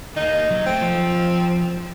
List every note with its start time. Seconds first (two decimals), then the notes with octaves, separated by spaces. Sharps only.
0.16 D#3 A#3 D#4
0.51 F#3
0.66 A3 C4
0.82 F3